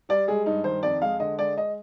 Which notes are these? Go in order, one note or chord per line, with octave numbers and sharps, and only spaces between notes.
G3 D5
G#3 G#4
G2 D#4
D#3 C5
F2 D5
G#3 F5
D3 D#5
G#3 D5
D#5